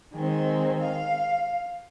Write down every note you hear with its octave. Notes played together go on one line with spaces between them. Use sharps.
D#3 G#3 C4
F5